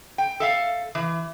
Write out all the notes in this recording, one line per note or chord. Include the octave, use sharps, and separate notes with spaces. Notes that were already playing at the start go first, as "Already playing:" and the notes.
G5
A4 E5 F5
E3